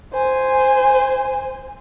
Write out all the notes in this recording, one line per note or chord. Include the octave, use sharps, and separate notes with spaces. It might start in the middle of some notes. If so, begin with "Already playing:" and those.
C5 G#5